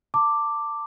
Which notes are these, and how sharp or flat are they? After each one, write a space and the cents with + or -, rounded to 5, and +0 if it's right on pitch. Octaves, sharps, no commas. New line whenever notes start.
A5 +30 D6 +0